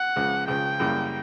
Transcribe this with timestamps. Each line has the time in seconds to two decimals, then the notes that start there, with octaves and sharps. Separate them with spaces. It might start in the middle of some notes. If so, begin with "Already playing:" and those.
Already playing: F#5
0.16 C#2 C#3 F3
0.48 C#2 C#3 F3 G5
0.80 F#2 C#3 E3 G3 A#3